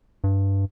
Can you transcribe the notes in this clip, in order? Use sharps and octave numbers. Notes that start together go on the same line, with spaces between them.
G2